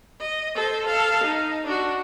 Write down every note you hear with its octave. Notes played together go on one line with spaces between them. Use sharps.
D#5
A4 C5
A4 F5
D#4
D4 F#4